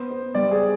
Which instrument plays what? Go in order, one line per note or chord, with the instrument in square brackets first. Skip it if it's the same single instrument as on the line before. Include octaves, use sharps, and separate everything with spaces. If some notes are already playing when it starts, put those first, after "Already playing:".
Already playing: [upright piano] B3 C5
B3
G3 D5
G#4